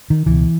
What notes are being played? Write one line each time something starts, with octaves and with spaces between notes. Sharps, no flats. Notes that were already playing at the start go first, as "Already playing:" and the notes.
D#3
C#2 B2 E3